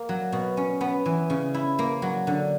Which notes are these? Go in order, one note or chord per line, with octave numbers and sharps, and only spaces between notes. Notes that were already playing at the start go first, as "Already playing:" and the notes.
Already playing: A#3
F#3
B2
C#4
B3
E3
C#3
E4
A#3
F#3
D3